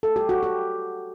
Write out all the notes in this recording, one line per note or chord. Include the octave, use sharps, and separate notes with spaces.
A4
G4
F#4
G4